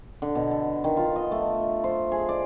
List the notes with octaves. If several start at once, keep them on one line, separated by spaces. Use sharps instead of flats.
D3
B2
A4
D#3
F4
D#5
A3
C5
G#4
D5